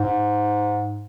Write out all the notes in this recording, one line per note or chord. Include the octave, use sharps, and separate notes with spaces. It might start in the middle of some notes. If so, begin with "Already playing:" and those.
Already playing: G#2